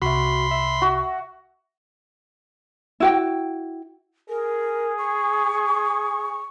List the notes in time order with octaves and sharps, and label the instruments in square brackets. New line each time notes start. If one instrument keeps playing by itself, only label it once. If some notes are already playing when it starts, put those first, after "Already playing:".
[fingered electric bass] C2 [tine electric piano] F#4 E5 [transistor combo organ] B5 C6
[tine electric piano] E5
[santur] F#4
[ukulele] E4 F#4 G5
[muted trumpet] G#4 [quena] A#4
[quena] C#6